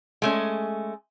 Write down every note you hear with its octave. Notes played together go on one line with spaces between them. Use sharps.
G#3 A3 C#4